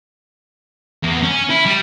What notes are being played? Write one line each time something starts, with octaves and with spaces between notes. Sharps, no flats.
E2
C#4
E4
G3